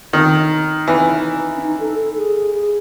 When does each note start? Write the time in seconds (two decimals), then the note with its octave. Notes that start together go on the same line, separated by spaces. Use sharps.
0.13 D#3 D#4
0.88 E3
1.57 C#4
1.61 D#4
1.80 A4
1.99 A4
2.17 G#4
2.36 G#4
2.54 G#4